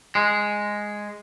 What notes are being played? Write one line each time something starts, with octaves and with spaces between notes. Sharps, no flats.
G#3